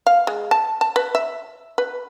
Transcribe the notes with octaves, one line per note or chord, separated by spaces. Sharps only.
F5
G#3
A5
A5
B4
E5
B4